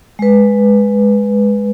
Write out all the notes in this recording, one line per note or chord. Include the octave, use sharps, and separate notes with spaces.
G#3 B4